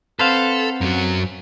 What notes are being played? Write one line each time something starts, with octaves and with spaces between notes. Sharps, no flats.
C4 A4 B4 C5 F5 F#5
F#2 F#3